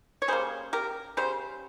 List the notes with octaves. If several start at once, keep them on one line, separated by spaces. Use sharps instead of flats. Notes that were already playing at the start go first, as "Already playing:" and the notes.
C#5
C#3 G3 A#3 G#4 C5
G4 A#4
C#3 G3 C5